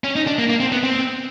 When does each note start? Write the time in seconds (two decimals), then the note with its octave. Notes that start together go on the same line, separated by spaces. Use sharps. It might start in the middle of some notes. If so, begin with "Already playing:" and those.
0.04 C#4
0.16 D#4
0.27 D4
0.39 A#3
0.49 A#3
0.60 C4
0.72 B3
0.83 C4